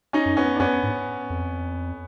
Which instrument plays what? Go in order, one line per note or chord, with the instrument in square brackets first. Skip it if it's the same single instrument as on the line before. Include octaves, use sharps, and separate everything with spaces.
[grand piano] C#4 D#4
[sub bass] F#2
[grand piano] B3 C#4
D4
[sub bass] F#2 [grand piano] B3 C#4
[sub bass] G#2
F2